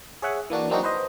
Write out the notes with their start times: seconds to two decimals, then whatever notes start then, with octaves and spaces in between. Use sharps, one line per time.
0.22 G#4 C#5 E5 F#5 G#5
0.50 E3 A#3 D4 F#4
0.70 F#3 A#3 C4 D4 D#4 F#4
0.83 B4 C5 D#5